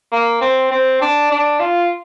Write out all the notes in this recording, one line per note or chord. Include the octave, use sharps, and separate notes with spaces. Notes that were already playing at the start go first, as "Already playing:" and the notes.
A#3
C4
C4
D4
D4
F4